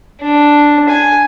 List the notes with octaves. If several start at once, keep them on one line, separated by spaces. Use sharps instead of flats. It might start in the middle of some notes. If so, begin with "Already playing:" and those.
D4
G#5